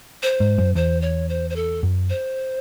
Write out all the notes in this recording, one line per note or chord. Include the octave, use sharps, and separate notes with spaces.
C5
G#2
F#2
E2 C5
C#5
C5
C5
A4
F#2
C5